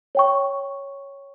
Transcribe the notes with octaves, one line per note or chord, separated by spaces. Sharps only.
C#5 G5 C#6